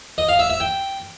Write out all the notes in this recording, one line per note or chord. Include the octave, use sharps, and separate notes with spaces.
D#5
F5
E5
E5
G5